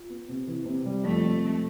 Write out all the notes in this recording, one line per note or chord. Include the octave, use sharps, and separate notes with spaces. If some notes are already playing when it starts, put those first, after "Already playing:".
Already playing: F4
B3
C3
E3
C3
G3
F2 A3
F2
C3